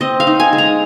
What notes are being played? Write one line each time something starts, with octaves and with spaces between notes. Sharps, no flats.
C4 D#5
F5
D#4
G#5
G#3
A#5